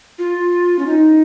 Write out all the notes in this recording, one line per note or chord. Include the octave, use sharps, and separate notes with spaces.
F4
C#4
D#4